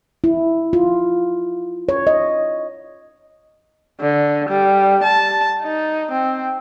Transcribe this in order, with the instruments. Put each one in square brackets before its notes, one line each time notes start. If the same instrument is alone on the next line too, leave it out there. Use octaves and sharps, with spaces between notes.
[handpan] E4
F4
C#5
D#5
[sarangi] D3
G3
A5
D#4
C4